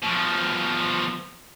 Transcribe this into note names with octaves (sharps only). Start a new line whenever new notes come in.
B2 F3